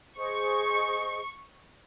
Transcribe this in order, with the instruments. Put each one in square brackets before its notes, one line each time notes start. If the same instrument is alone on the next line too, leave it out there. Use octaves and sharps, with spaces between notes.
[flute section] G#4 C5 D#5 [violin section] C#6